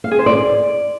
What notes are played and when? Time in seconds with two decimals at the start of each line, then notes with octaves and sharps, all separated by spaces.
0.04 F5
0.11 G#4
0.19 C5
0.26 D5